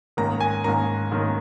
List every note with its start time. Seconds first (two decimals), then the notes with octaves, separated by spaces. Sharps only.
0.17 G#2 D#3 A#3 C#4 A#5
0.40 G#5
0.64 G#2 D#3 A#3 C#4 A#5
1.12 G#2 D#3 A#3 C#4